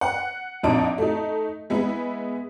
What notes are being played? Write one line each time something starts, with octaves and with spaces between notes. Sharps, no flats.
F#5
A#1 F2 D4 D#4 D7
A3 D#4
G#3 B3 E4